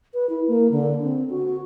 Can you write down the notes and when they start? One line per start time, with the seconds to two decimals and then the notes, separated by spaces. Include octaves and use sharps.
0.14 B4
0.29 E4
0.48 A#3
0.72 D3
1.03 C4
1.30 F#4